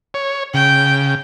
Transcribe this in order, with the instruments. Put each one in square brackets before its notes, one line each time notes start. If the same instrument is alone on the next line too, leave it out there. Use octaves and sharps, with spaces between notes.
[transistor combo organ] C#5
[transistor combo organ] C#3 [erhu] G5